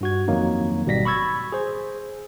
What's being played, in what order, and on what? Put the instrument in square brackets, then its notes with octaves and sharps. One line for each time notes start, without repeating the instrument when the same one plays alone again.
[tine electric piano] G2 F#4 G#6
F2 D#3 F#3 A#3 D#4
G#1 B2 G3 A#6 B6
B5 C#6 E6 G#6 A6
G#4 C5